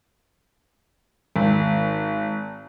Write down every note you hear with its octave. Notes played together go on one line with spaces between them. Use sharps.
G#1